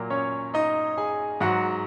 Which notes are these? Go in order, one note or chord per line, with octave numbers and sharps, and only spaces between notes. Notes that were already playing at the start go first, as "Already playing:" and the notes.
Already playing: A#2 F#3 A#3 A#4
C#4 C#5
D#4 D#5
G#4 G#5
G#2 F#3 F#4 F#5